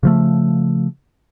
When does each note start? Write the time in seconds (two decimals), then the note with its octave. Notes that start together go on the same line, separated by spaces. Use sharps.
0.03 C#3 F3 A3